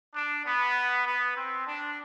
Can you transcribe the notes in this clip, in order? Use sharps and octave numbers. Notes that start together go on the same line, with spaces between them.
D4
B3
B3
C4
D4